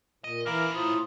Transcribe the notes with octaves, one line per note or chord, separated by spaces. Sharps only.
A#2 D#5
A#2 E3 E4 A#4 F5 D6
A2 F4 C5 A#5 D#6